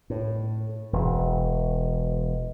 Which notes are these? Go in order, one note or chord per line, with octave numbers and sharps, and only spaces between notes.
A2
E1